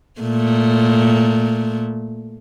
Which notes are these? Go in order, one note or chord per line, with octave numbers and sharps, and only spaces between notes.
A#2 A3